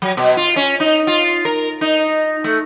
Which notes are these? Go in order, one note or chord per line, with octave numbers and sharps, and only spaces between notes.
F#3
B2
F4
C#4
D#4
F4
A#4
D#4
A3